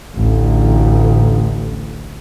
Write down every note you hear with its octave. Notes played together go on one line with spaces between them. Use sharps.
A1 D2